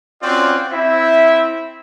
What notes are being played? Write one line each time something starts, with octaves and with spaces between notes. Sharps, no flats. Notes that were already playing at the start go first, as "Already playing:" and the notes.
C4 C#4 F4 F#4 C5 D5
C4 E4 E5